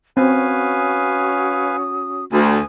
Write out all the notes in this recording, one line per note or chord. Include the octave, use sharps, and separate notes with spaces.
C4 C#4 F#4 B4 F5 G#5 D#6
D2 G#5 D#6